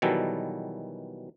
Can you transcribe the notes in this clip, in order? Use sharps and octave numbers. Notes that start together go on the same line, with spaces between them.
B2 D#3 E3 F#3 G3 A4